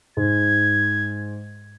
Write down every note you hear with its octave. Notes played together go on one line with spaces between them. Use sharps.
G#2 G#6